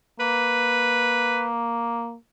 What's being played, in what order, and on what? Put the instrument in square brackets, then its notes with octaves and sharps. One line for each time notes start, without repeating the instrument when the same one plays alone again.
[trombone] A#3 [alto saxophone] B4